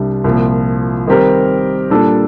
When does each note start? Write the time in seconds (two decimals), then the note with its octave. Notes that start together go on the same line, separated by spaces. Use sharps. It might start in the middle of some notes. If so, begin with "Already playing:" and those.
Already playing: C2 C3 G3 D4
0.24 C2 A#2 F3
1.07 D#3 G3 C4 G4 A#4
1.90 A#2 G3 D4 A4